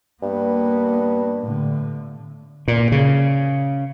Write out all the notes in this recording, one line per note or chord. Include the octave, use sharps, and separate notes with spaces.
G2 A#3 B3
A2 D3
A#2
C#3